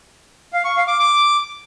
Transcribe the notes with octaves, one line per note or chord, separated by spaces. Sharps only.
F5
C#6
F5
D6
D6